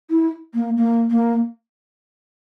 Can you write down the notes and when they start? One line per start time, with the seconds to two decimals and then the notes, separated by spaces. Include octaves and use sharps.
0.10 E4
0.54 A#3
0.77 A#3
1.11 A#3